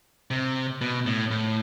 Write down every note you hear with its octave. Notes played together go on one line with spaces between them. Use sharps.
C3
B2
A2
A2